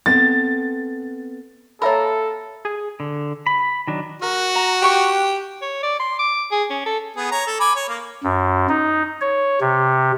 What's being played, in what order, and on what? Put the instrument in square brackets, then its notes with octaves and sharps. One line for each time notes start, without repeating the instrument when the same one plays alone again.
[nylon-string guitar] B3 C4 A4 [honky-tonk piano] A6
[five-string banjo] A#3 A#4 [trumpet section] A4 [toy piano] C#5 E5 B5
[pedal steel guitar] G#4
D3
B5
D#3 F#3 D4
[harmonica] F#4 [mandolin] A#4
[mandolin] A#5
[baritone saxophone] G4 [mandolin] G5 C#6 F#6
[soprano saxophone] C#5
D5
C6
D6
G#4
C#4
A4
[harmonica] B3 G#4
C#5 A#5
A4
G#5 B5 D6
C#5
A#3
[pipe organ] F#2
D#4
C#5
C3